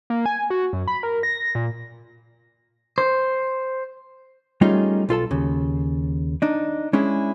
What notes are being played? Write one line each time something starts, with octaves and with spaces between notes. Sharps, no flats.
A#3
G#5
F#4
F#2
B5
A#4
A#6
A#2
C5
G3 A3 C#4 D#4 F4 G#4
B1 F4 A4 A5
D#2 C#3
D4 D#4
G#3 C#4 D4 E4 G#4